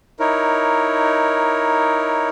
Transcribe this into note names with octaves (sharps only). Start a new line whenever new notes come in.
D#4 E4 A#4 C#5